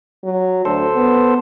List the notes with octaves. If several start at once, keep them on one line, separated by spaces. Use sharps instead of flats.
F#3
D2 A4 C5
B3